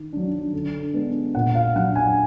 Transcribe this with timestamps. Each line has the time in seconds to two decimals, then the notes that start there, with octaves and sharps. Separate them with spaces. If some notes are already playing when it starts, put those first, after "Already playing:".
Already playing: D#3
0.13 F#3 D4
0.53 D3
0.94 G#3 B3 D4
1.35 A#2 F#5
1.55 F5
1.76 F#3 D4 F#5
1.96 G#5